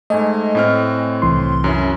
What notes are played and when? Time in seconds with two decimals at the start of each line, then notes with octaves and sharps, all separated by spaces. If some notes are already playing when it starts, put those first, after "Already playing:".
0.10 G#2 A3 D#5 G#5
0.55 A2 C4 F6
1.22 C2 E3 C6
1.64 F#2 C#4 E4